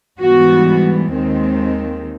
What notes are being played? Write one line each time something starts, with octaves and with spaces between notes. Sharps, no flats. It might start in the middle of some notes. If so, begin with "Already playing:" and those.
G#2 E3 G3 B3 F#4
D#2 D#3 G#3 C4